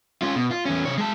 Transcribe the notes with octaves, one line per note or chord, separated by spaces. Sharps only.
C#4 F4
B2
F4
E2 C#4
C3 C#5
G#3 A5